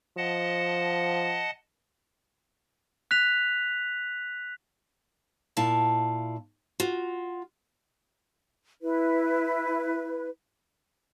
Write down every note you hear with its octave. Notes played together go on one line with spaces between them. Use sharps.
F3 D#5 F#5 A5
F#6 B6 F7
A#2 E4 F5 A5
F4 F#4
E4 B4